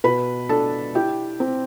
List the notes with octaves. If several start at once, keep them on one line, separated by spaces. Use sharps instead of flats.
B2 B4 B5
D4 A4 A5
E4 G4 G5
C4